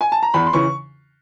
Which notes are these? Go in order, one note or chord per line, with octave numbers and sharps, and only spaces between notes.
G#5
A5
A#5
E2 B5
C6
C#3 E3 C#6